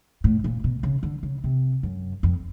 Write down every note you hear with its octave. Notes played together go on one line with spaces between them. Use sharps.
A2
A#2
B2
C#3
D3
C#3
C3
F#2
F2